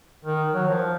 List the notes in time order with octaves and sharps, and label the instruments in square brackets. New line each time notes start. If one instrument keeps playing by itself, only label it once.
[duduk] D#3
F#3
F3